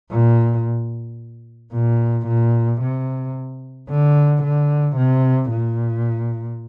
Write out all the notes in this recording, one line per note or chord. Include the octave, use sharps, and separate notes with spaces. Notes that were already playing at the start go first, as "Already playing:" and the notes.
A#2
A#2
A#2
C3
D3
D3
C3
A#2